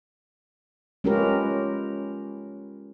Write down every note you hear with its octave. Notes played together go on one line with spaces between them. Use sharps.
G#3 C#4 F4 G4 A#4 B4